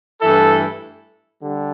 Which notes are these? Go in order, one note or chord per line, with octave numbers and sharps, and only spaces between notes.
G2 E3 A3 E4 A4
D3 G3